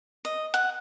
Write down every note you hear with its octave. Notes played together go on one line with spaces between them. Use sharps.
D#5
F#5